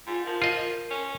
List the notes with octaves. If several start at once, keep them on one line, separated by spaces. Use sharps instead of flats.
G#2 F4
F3 A#4
F4 D#5
C#4